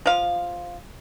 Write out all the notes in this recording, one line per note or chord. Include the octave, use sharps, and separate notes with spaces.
F3 F5